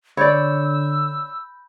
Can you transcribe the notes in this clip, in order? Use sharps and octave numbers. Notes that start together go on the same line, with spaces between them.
D3 C#5 D5 B5 E6 G6